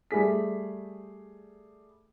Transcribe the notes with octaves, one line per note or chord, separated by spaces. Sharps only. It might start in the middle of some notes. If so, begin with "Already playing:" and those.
G3 A3 G#4 B6